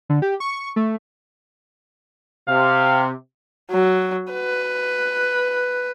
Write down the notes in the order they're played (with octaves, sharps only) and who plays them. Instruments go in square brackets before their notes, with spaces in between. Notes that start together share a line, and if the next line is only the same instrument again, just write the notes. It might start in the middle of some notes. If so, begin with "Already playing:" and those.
[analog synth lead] D3
G4
C#6
A3
[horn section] C3 [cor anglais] F5
[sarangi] F#3
B4